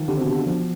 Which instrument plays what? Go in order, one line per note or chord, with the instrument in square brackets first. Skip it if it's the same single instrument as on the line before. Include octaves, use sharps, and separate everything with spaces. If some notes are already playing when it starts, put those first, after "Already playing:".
Already playing: [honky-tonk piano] D#3 F3
[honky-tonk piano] D3 [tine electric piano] G4
[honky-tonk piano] C3
B2
[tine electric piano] D4
[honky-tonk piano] B2
[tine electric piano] F3